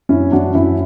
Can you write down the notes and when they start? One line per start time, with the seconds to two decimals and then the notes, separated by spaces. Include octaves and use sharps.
0.09 F#2 C#4 E4
0.32 F#2 D4 F#4
0.55 F#2 C#4 E4